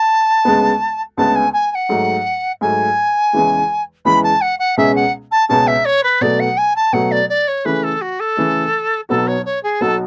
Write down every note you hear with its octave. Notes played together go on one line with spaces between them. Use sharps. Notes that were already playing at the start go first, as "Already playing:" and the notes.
Already playing: A5
D2 C#3 G#3 B3
D2 C#3 G#3 B3 A5
G#5
G#5
G#5
F#5
G#2 F#3 A3
G#2 F#3 A3 G#5
E2 C#3 E3 G#3
E2 C#3 E3 G#3 B5
A5
F#5
F#5
C#2 B2 G#3 C#4 G#4 E5
F#5
A5
C#2 B2 G#3 C#4 G#4 A5
E5
C#5
B4
B2 F#3 A3 D5
F#5
G#5
A5
B2 F#3 A3 F#5
D5
D5
C#5
C#3 E3 A3 B4
A4
F#4
A4
C#3 E3 A3
B1 B2 F#3 B3 F#4 A4
C#5
C#5
G#4
B1 B2 F#3 B3 F#4 A4